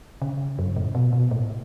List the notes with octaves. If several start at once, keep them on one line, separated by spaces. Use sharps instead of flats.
C#3
F#2
A2
B2
B2
A2